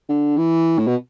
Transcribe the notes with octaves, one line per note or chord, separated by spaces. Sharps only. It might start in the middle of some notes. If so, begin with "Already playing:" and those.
D3
E3
A2
B2